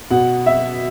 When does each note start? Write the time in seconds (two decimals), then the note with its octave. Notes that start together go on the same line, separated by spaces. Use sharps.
0.11 B2 F#5
0.46 E5